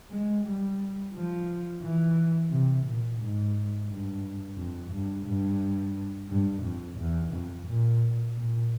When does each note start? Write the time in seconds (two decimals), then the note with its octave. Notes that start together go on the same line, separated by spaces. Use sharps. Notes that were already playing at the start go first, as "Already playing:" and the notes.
0.10 G#3
0.44 G3
1.14 F3
1.82 E3
2.50 C3
2.85 A#2
3.19 G#2
3.89 G2
4.57 F2
4.91 G2
5.26 G2
6.29 G2
6.63 F2
6.98 E2
7.33 F2
7.66 A#2
8.36 A#2